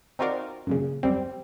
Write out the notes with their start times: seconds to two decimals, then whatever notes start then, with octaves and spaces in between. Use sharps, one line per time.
0.19 C4 D#4 F4 F#4 A#4 D5
0.67 F#2 A#2 C#3
1.03 F#2 G3 C4